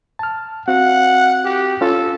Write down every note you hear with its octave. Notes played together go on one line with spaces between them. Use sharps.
A5 F6
C4 F#4 F5 F#5
G4
C#4 F4 A4